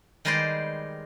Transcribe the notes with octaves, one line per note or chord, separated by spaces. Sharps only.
D#3 G3 G#3 B4 C5 D5